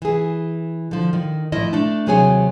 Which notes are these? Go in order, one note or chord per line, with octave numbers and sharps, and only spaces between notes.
E3 G#4
D3 F3
D#3
A2 F3 E4 D#5
A3 D4
D#2 C3 F#3 G#4 C#5 G#5